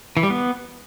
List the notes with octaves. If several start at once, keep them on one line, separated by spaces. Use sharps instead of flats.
E3
G3
B3